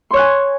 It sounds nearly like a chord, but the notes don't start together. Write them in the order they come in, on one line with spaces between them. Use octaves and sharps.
C6 C#5 F#6 G#5